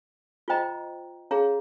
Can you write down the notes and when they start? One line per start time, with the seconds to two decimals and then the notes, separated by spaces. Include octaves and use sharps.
0.48 F4 C5 D#5 G5 A#5
1.31 C#4 G#4 C#5 F5 A#5